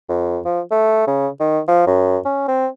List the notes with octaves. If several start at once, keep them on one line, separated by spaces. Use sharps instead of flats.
F2
F3
A3
C#3
D#3
F3
F#2
C#4
C4